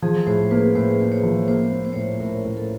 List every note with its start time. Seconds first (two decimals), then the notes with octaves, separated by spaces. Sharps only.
0.02 F3 G#4
0.27 A2 C5
0.51 A#3 B4
0.75 A2 C5
1.00 A#3
1.12 C#5
1.23 F3
1.48 A#3 C5
1.73 A#3
1.85 C5
1.93 A2 C#5
2.02 C5
2.20 A2 A#4
2.45 A2
2.57 A4